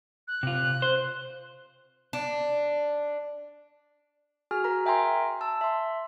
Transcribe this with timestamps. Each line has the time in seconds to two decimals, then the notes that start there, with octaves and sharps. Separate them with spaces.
0.28 F#6
0.43 C3 F4
0.82 C5
2.13 D4
4.51 F#4 G#4 G#5 F6
4.64 A#4 A#5
4.86 E5 G5 G#5 A#5 C6
5.41 A5 E6
5.61 E5 C6